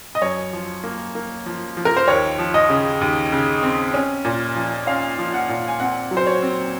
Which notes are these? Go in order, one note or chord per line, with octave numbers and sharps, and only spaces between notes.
D#5
F#2 C#5
F3
A#3
A#3
F3
F3
A#4
C5
D#2 C#5
F3
D#5
C#3
D#2
C#3
C4
C#4
A#2
F3
C#4 F5
F3
F#5
A#2
G#5
C4 F#5
F#3
C5
C#5
C4